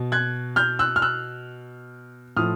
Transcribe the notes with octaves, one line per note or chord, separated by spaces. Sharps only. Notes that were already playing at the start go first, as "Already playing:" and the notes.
Already playing: B2
F#6 G#6
F6 G6
E6 F#6
F6
E6 F#6
A2 F3 D#6 F6